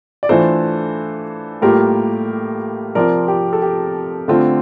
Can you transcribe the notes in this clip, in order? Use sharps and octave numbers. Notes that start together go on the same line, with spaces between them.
D5
E3 A3 D4 F4 A4 C5
A2 G3 A#3 F4 G4 A#4
C3 F3 C4 F4 A#4 D5
G4
A4
G4
D3 A3 C4 F4